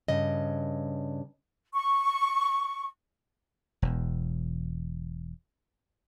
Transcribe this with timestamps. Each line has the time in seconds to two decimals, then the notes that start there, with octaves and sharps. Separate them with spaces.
0.08 G2 C#3 D#5
1.74 C#6
3.82 E1 E2